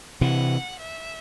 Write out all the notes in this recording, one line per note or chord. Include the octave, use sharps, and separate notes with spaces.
C3 E3 F#5
E5